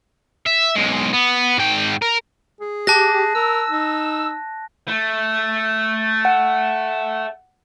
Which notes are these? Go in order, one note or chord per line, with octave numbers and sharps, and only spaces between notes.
E5
B1 G#3
B3
G#2 G5
A#4
G#4
G4 A5 F#6 A#6
A#4 E6
D#4
A3
F#5